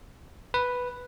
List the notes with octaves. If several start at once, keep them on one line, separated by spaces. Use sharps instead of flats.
B4